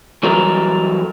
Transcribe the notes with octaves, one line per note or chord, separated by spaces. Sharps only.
E3 F#3 G3 A4 A#4